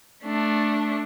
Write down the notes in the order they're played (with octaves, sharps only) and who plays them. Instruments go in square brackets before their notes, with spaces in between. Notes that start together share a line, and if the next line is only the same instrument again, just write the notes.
[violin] A3 D4